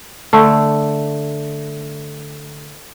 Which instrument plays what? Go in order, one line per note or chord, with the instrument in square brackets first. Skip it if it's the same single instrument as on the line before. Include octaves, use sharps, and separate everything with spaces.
[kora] D3 A3